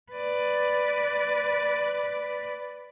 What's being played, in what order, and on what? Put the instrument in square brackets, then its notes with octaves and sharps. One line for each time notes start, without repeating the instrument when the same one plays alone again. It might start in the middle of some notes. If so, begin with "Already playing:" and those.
[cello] B4 D5